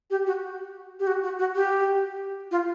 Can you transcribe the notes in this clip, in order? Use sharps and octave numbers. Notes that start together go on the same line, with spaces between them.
G4
F#4
G4
F#4
F#4
F#4
G4
F4